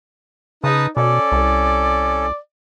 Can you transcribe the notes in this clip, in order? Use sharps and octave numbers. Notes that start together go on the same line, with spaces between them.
C#3 D#4 B4 A5 D#6
B2 C#4 A4 D5
C2